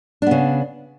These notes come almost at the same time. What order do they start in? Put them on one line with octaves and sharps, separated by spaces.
D4 B3 C#3